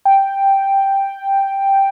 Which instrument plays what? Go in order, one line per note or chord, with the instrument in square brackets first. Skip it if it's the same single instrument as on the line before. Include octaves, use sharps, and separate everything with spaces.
[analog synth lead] G5